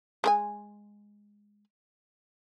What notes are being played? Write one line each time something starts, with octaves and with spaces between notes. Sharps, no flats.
G#3 A#4 G#5